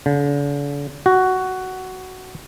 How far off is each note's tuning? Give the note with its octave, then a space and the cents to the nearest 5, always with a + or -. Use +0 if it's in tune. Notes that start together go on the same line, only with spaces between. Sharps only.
D3 -45
F#4 +10